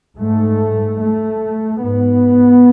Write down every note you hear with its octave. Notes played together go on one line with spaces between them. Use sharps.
G#2 A3
A3
G#2 B3